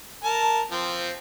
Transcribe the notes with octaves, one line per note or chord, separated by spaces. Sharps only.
A#4 A5
F3 C4